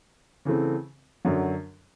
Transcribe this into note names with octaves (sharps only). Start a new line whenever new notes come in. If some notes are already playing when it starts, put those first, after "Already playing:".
C#3 E3 A3 C4
F#2 D3 F#3